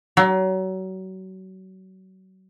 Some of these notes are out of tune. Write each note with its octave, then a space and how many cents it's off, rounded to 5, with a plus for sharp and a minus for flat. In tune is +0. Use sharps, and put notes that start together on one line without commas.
F#3 +30